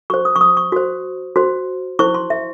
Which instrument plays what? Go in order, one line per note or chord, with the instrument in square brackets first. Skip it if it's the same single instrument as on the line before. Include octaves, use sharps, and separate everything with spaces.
[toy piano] F#4 C5 C#6
D#6
C#6
D#6
C#6
F#4 C5
F#4 C5
E4 C5 C#6
C6
E5